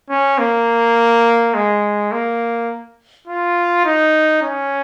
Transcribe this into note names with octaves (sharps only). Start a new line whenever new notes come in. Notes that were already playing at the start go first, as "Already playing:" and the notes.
C#4
A#3
G#3
A#3
F4
D#4
C#4